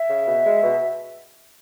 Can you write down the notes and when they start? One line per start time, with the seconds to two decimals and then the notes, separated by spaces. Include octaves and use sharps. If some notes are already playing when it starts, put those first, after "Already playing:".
Already playing: E5
0.10 C#3
0.27 B2
0.46 G#3
0.63 B2